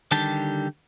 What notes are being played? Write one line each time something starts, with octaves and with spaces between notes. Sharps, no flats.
D3 D#3 G3 G4 A5